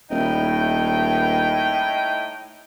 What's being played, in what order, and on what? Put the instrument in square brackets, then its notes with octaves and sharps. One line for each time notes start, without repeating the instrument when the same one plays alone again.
[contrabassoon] D#1 [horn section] A2 D#4 G5